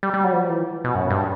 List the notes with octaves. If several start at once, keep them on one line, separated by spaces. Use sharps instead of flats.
G3
G3
F#3
F3
E3
B2
F#2
G2